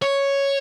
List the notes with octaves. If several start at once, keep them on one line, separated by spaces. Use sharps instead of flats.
C#5